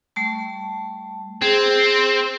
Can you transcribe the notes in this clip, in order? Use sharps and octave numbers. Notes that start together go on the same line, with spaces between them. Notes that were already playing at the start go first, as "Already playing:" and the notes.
G3 A3 A5
C4 G#4